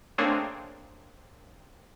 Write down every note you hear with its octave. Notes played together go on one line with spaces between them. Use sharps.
A3 A#3 C4 D4 G#4 C#5